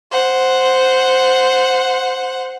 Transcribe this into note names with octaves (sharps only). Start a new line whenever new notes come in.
C5 F#5